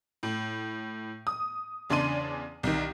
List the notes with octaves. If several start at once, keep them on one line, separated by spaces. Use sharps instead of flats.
A2
D#6
E2 C#3 D4 D5 C6 D#7
C2 D#3